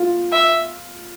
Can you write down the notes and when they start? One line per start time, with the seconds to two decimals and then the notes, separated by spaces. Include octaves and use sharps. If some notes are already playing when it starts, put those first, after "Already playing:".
Already playing: F4
0.32 E5